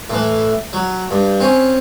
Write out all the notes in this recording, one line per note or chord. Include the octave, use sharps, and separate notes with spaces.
A2 E3
F#3
G2
C4 C#4